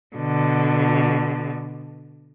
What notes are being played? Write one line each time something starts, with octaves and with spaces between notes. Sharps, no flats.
B2 D3